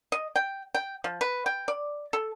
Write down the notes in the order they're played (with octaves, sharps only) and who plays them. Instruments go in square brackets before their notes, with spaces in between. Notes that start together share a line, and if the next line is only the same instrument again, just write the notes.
[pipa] D#5
G5
G5
F3
B4
G5
D5
A4